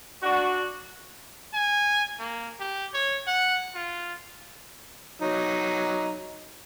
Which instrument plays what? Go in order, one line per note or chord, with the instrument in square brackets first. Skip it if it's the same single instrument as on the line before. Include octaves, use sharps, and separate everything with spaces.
[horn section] D4 F#4
[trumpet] G#5
A#3
G4
C#5
F#5
F4
[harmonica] F#3 D#4